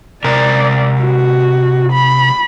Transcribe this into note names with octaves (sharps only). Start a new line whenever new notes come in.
C3 A#4 D5
F#4
B5